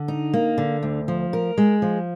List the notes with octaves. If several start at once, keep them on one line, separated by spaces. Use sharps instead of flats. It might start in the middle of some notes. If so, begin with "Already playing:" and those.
Already playing: D3
D#4
A#3
D3
D2
F3
A#4
G#3
F3